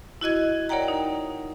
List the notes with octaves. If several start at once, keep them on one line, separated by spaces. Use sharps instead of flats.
E4 F#4 D#5 G#6
A#4 C#5 D5 F#5 G5 A#5
D#4